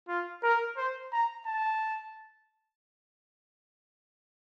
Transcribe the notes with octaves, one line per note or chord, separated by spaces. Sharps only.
F4
A#4
C5
A#5
A5